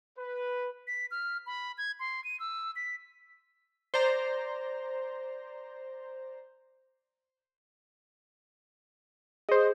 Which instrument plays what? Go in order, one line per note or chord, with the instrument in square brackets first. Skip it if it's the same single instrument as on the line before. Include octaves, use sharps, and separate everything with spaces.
[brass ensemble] B4
[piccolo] B6
F6
B5
G#6
C6
D#7
E6
B6
[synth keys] C5 D5 A#5
[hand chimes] G#4 [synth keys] C5 D#5